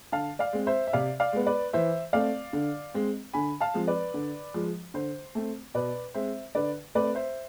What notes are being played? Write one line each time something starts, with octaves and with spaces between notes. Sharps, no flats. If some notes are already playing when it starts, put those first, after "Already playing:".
D3 F5 A5
D5 F5
G#3 C4
C5 E5
E5
C3 D5 F5
D5 F5
G#3 B3
B4 D5
E3 C5 E5
A3 C4 D5 F5
D3
G#3 C4
D3 G#5 B5
F5 A5
F3 G#3 C4
B4 D5
D3
F3 G#3
D3 C5
A3 C4
B2 B4 D5
G#3 C4 C5 E5
D3 B4 D5
A3 C4 B4 D5
C5 E5